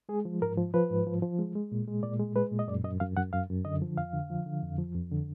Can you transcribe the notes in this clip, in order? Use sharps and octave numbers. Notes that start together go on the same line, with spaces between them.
G#3 G#4
F3
G#2 A#4
F3
F3 B4
G#2
F3
F3
G#3
G#3
A#2
G#3
A#2 D5
G#3
G#3 B4
A#2
D#5
F#2 D5
F#2 D#5
F#2 F5
F#2 F#5
F#2 F5
F#2
D3 D#5
F3
F2 F5
D3
F3
D3
F2
F3
F2
D3